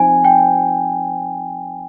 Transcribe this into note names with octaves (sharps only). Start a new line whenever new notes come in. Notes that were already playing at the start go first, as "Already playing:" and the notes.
Already playing: F3 C4 D#4 G#5
G5